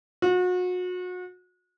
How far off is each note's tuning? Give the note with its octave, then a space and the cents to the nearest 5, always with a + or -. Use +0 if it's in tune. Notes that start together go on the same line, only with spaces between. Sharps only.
F#4 -35